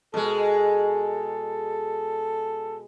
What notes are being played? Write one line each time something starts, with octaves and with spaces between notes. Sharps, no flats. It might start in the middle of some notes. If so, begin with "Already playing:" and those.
B2 G#3 A4